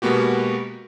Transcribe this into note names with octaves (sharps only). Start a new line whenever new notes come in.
B2 G#3 A#3 B3 F#4 G4